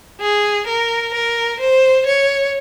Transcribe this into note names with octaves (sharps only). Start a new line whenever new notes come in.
G#4
A#4
A#4
C5
C#5